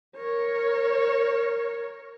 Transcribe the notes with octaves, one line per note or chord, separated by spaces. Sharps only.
A#4 C#5